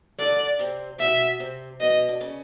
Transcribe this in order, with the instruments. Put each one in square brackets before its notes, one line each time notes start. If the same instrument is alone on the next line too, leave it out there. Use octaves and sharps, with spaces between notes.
[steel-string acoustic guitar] D3 D4 [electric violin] D5
[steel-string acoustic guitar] C3 C4
[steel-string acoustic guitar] B2 B3 [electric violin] E5
[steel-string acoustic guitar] C3 C4
[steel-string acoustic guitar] B2 B3 [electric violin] D#5
[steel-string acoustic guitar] D4
C#3 C#4